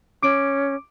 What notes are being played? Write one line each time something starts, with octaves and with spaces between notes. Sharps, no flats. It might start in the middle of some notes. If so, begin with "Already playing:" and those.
C#4 D6 D7